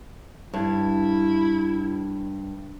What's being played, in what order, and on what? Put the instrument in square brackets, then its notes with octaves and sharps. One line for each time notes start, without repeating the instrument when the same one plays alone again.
[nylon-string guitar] G2 [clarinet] E4